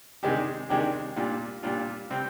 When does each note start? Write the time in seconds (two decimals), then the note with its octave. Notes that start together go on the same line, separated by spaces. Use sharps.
0.23 C3 D#3 G#3 D4 G4
0.69 C3 D#3 G#3 D4 G4
1.16 A#2 G3 D4 F4
1.63 A#2 G3 D4 F4
2.10 C3 G3 C4